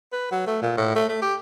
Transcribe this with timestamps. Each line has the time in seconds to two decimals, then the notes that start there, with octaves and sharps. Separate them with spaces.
0.12 B4
0.32 F#3
0.47 A3
0.62 A#2
0.77 A2
0.96 A3
1.09 A3
1.22 G4